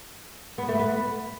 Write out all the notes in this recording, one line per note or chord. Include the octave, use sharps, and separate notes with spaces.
B3
A3
B3